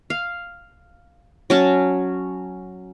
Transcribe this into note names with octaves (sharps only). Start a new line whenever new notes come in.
F5
F#3 C#4 A5